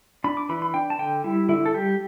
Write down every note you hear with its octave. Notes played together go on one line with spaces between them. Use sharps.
D4 B5
D6
E3 B5
B5
D4 G5
A5
D3 G5
G3 E4
D3 E4
A4
G3 G4